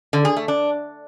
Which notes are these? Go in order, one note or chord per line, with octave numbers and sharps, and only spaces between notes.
D3
G#4
A3
D4